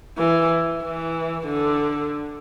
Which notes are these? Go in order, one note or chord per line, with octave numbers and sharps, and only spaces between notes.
E3
E3
D3